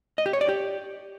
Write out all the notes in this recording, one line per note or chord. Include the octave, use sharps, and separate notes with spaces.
D#5
G4
C#5
D5
G4